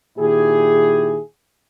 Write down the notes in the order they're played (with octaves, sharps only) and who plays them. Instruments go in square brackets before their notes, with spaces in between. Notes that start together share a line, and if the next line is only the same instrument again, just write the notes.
[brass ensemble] A#2 D#3 E4 G4 G#4